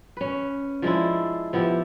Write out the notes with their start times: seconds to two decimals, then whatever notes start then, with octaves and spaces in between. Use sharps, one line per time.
0.17 C#4 B4
0.82 F3 G#3 D4 E4
1.53 F3 B3 E4 G4